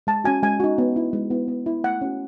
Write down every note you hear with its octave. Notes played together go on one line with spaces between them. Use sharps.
G#3 A5
C#4 F#4 G#5
G#3 G#5
D#4 F#4
B3
E4
G#3
B3 E4
B3
E4
A3 F#5
C#4 F#4